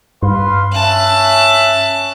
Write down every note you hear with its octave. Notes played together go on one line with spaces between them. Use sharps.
G2 B4 F5 C6
C#4 E5 A5 F#6